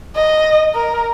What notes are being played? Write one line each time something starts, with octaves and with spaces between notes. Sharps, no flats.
D#5
A#4